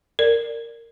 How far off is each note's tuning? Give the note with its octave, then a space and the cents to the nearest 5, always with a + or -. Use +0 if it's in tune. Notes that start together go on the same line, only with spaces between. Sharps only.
A#4 -10 D5 +0